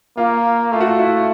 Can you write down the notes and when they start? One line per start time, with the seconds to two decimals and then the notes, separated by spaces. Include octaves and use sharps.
0.17 A#3 F4
0.72 A3 F4
0.80 F#4
0.88 F4
0.99 E4